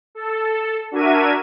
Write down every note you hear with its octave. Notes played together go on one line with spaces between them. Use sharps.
A4
D4 F#4 A#4 E5 G#6 D#7